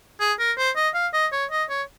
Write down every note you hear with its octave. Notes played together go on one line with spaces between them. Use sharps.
G#4
A#4
C5
D#5
F5
D#5
C#5
D#5
C#5